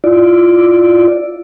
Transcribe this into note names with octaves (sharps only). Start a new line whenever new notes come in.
E4 F4 D5